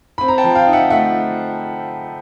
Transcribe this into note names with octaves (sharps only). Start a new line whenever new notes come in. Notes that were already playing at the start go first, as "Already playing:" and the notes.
C4 B5
A#5
G5 A5
F3
F5 G5
D#4
E5 F#5
A3 E5 F#5